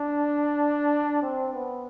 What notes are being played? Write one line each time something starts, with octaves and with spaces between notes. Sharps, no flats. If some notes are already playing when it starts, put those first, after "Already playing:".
Already playing: D4
C4
B3